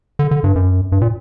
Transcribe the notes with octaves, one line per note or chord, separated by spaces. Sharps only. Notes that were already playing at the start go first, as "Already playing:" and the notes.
D3
D3
G2
F#2
G2
A#2